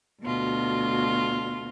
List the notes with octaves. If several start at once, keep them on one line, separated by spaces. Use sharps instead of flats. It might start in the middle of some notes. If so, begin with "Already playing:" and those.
D2 B2 F4